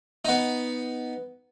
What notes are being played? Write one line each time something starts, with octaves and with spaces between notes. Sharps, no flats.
B3 D#4